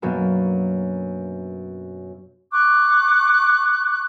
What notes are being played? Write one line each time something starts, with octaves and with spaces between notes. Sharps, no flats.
F#2 B2 F#3 A#3 B3 D4
C#6 D6 F#6